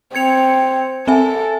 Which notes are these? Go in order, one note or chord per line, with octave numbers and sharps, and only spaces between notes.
C4 G#6 C#7 F7
C4 A4 E5 G#5